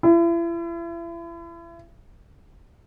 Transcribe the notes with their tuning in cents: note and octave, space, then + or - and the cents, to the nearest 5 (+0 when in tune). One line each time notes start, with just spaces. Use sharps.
E4 +40